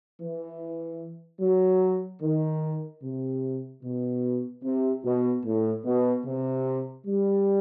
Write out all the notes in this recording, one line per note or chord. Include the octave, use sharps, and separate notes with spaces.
E3
F#3
D#3
C3
B2
C3
B2
A2
B2
C3
G3